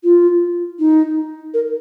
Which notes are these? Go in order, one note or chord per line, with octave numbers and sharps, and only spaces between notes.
F4
D#4
A#4